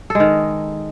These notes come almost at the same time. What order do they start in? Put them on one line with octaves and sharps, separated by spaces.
A4 G#3 D#3